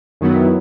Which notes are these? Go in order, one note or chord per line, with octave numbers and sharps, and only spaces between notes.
F#2 D#3 F#3 B3 E4